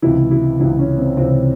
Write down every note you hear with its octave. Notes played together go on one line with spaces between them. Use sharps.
C#2 C3 E3 E4
E4
C#2 C3 E3 E4
C#4
C4
C#2 C3 E3 C4